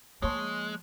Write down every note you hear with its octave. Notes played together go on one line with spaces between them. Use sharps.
F3 G#3 A#3 C#5 A5 C6